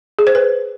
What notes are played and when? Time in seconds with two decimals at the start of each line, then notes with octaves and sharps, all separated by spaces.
0.19 G#4
0.27 C5
0.35 B4